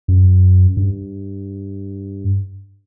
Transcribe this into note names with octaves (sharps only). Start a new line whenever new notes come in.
F#2
G2